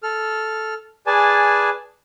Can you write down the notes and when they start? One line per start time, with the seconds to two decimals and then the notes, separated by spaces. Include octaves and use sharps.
0.03 A4 F6
1.07 G#4 B4 D5 G#5 A5